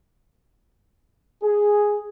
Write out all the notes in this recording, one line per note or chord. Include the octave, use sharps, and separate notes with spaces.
G#4